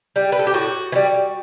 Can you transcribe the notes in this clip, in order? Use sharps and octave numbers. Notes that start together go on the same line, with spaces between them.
G3
B4
A4
G4
A2 F#4
E3
G3